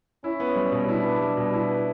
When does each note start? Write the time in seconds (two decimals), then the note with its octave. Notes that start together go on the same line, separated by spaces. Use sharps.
0.24 C#4 E4
0.40 B3
0.55 G3
0.72 B2
0.88 D4 E4
1.04 B3
1.20 G3
1.37 B2
1.53 E4
1.69 B3